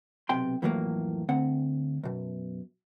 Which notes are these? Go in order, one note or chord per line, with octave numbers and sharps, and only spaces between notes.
B1 C3 G5 C6
F2 A2 E3 F#3 G3 A#3
D2 C4 F#5
F#2 B2